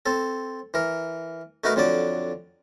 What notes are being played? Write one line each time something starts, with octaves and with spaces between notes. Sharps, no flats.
C4 A4
E3 A#4
A3 D#4 F#4 A#4 B4
F2 D3 F#3 D5